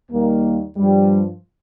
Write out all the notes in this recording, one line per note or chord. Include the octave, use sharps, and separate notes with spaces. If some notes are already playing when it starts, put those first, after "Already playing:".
D#2 D#3 G3 A#3
G2 F3 G3